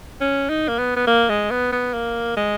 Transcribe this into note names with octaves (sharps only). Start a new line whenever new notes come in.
C#4
D#4
A#3
B3
B3
A#3
G#3
B3
B3
A#3
G#3